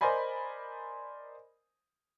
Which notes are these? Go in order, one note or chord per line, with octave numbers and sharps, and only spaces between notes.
A#4 C5 D5 D#5 G#5 B5